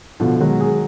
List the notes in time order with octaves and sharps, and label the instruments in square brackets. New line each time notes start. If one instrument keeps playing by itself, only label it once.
[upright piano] B2 [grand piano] D3 F3
[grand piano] D#3 F#3 [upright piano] G#3
[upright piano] G#4